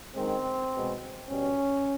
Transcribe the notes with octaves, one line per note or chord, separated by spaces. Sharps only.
F#2 D#3 G#3 C4
B2 G#3
B2 G3 C#4